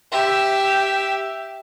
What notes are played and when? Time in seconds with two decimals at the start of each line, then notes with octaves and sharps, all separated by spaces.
0.12 G4 E5